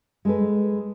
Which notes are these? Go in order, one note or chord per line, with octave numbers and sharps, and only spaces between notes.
G#3 A4 B4